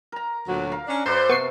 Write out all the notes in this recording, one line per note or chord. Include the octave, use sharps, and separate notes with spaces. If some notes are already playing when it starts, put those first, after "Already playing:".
A#4 A#5
D2 A#2 F#3
A#4 F5
C#4 D4
F#2 A4 B4 C5 D5
C3 B3 C#6 C7